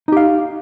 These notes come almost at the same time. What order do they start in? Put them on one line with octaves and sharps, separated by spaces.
D#4 G4 F5